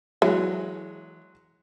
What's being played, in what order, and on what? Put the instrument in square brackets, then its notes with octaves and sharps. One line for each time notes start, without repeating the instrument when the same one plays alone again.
[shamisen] E3 [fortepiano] F#3 G#3